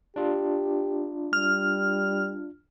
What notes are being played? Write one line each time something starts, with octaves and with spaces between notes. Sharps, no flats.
D4 F4 G4
G3 F6